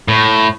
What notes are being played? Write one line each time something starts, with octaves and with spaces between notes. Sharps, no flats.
A2